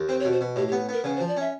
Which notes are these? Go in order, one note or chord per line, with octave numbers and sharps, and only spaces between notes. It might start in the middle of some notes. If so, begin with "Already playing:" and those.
Already playing: D#2
C4 C5
C#5
B2
C5
B2
A2 G4
G4
B3
B3 A#4
C#3 B4
C5
F3
D5
C#4 E5